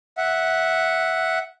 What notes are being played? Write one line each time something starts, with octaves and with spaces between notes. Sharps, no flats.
E5 F#5